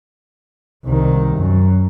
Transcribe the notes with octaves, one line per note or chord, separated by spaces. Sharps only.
C2 D#3
F#2